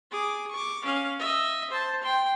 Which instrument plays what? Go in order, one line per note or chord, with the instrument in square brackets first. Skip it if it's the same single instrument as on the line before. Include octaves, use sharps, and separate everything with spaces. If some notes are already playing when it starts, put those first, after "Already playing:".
[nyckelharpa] G#4 D6
C#6 D6
C#4 F5
D#5 E5
C5 A5
G5 C6